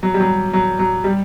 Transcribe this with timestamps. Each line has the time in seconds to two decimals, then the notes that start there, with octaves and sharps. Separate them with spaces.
0.03 F#3
0.14 G3
0.20 F#3
0.53 F#3
0.79 F#3
1.04 G3